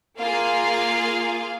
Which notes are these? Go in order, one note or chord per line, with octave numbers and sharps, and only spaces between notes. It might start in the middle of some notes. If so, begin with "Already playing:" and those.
A#3 F4 G#4 F5